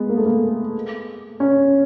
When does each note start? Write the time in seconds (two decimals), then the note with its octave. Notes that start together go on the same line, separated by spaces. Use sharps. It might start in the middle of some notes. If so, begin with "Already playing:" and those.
Already playing: G#3 B3
0.09 A#3
0.17 A3
0.26 A#3
1.40 C#4